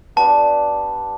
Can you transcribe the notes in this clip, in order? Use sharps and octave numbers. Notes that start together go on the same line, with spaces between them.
B3 D4 G4 A5